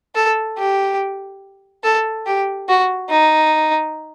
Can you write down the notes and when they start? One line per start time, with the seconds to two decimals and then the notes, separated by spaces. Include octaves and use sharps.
0.15 A4
0.58 G4
1.83 A4
2.26 G4
2.69 F#4
3.10 D#4